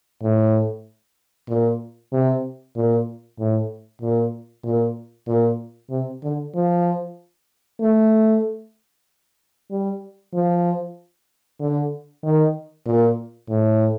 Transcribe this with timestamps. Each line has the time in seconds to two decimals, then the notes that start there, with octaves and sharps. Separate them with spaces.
0.22 A2
1.49 A#2
2.13 C3
2.76 A#2
3.39 A2
4.02 A#2
4.64 A#2
5.27 A#2
5.91 C3
6.23 D3
6.55 F3
7.80 A3
9.71 G3
10.34 F3
11.60 D3
12.23 D#3
12.86 A#2
13.49 A2